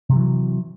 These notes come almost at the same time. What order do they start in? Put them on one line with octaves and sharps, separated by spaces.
C3 G3 E3 F#3